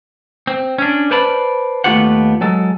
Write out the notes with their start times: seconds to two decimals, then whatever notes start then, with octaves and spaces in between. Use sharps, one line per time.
0.47 C4
0.78 C#4 D4
1.11 B4 C5 D5 A5 B5
1.84 D#2 A3 B3 F4 G4 F#5
2.41 F#3 G#3 A4